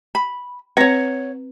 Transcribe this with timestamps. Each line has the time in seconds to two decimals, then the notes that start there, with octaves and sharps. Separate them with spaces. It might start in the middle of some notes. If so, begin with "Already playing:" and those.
0.15 B5
0.77 C4 B4 C#5 F#5